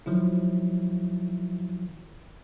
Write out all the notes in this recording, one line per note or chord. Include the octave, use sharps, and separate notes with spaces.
D#3 F3 F#3 E4